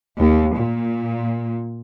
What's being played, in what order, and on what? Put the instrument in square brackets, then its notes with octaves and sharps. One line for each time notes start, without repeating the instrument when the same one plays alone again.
[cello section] D#2
A#2